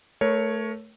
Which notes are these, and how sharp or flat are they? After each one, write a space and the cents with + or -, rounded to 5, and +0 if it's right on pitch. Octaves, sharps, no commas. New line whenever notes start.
A3 +0 A#4 +30 C#5 +0